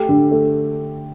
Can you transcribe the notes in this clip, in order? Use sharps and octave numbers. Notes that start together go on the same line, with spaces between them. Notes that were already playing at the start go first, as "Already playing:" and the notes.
Already playing: A3 G4
D3
A3